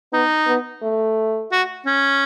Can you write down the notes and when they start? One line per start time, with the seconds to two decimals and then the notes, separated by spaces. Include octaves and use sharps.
0.13 B3 D#4
0.47 B3
0.83 A3
1.52 F#4
1.86 C#4